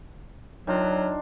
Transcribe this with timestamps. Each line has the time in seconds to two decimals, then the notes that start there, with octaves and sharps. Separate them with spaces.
0.67 D#3 F#3 D4 F4